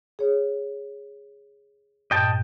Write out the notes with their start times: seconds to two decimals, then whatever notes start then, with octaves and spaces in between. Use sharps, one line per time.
0.19 G#4 C#5
2.11 G2 A#2 D#5 G5 A5